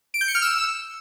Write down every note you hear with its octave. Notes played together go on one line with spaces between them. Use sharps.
D7
G6
C#7
F6
E6